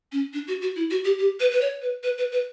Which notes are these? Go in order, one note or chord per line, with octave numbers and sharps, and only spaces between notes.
C#4
D4
F#4
F#4
E4
F#4
G4
G4
B4
B4
C#5
B4
B4
B4
B4